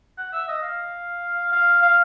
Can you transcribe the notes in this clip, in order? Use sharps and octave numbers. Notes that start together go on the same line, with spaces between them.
F#5
E5
D#5
F5
F5
F5